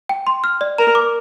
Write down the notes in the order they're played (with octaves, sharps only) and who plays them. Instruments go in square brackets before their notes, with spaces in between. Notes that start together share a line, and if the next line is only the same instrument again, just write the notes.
[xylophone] G5
C6
F6
D5
[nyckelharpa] A#4 [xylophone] A#5
[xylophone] D6